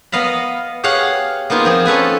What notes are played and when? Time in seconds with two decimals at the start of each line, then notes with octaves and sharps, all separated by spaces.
0.12 B3 D#5 F5 A#5 B5
0.84 G4 G#4 C#5 F5 F#5
1.50 A#3 B3 D#4 F4 G#4
1.65 F3 C4 G#4
1.85 C#4 A4 B4 G#5